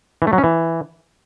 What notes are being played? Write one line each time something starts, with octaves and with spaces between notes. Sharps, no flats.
E3
A3
F#3
C#4
E3